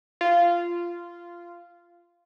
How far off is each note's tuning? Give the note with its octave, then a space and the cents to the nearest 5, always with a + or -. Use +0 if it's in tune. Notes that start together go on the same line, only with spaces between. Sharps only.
F4 -15